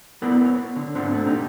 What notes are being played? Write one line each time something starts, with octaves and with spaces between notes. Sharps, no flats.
B3 E4 A#4 D5 F#5
C#5
D3
G#2 C4 D4 F4 F#5
A3 D4 D5
A#2 D#4 G4